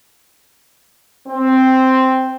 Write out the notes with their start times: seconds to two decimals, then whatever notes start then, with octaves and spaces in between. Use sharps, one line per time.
1.29 C4